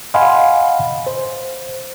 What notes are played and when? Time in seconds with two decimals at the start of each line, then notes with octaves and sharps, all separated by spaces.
0.14 D#5 F5 F#5 G#5 B5 C6
1.07 C5